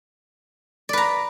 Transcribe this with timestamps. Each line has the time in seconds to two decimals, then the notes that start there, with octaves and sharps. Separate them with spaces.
0.89 D5
0.93 B4
0.98 A#5